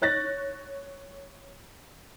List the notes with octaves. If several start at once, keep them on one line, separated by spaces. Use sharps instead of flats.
C#5 F#6 A6 A#6